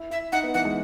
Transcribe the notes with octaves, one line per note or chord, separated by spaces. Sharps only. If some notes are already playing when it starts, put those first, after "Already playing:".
Already playing: E4
E4 E5
D#4 F#5
B3
E3 F#5
G#3